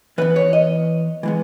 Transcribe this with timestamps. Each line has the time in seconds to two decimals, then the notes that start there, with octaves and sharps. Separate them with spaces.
0.18 E3 B3 B4
0.36 C#5
0.53 D#5
1.23 E3 G#3 B3